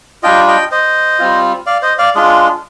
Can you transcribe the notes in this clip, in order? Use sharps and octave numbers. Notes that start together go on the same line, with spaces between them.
G3 D4 F4 D#5 G5
D#5 G5
C5 D#5
G3 C4 F4
D5 F5
C5 D#5
D5 F5
G#3 D4 F4 G#4